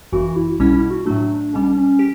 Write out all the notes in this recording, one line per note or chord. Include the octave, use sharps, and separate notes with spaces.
G1 F#2 E3 F#4
E4
B1 B2 G3 C#4 E4
E4
F#4
A2 F#3 A3 D4
B1 B2 G3 C#4
C#4
G4